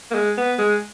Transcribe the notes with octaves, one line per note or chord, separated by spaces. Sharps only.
A#3
G#3
B3
G#3